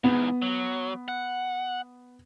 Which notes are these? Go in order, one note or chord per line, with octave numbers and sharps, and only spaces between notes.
E2 G#2 B3
F#3
F#5